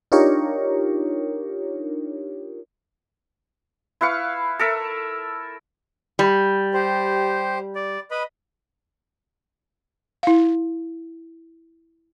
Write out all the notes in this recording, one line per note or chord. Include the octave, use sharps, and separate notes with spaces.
D4 D#4 F4 G4 A#4 C#5
E4 B4 F5 C#6
A4 A#4 E5
G3
G4 C5
D5
B4 D#5 B5
E4 F5